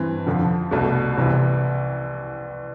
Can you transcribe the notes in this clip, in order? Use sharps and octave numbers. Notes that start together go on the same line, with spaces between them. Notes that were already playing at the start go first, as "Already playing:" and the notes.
Already playing: G2 E3 C4
F2 D3 F3
C2 B2 A3
C2 C3 E3